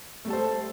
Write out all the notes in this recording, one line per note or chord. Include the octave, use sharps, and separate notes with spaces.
G3 A3 A4 C5